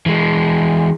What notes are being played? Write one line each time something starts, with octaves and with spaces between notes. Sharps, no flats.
E3 G#3